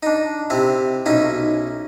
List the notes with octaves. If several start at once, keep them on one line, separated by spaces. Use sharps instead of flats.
D4 D#4
C3 C4 E4
B1 C#4 D#4 E4